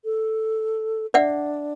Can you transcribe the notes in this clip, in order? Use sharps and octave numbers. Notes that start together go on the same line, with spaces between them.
A4
D4 D5 E5 F#5